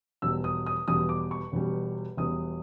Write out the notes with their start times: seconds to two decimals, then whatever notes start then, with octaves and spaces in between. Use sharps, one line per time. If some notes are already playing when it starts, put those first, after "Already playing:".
0.22 E1 E2 B2 G3 E6
0.44 D#6
0.66 D#6
0.88 E1 E2 B2 G3 D#6
1.09 D6
1.31 C#6
1.52 E1 E2 B2 G3
2.17 E1 E2 B2 G3 D#6